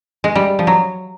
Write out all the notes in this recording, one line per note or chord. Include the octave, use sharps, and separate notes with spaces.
G#3
G3
F3
F#3